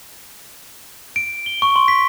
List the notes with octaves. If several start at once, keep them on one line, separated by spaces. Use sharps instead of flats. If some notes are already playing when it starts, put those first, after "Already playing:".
D7
G7
C#6
C6
B6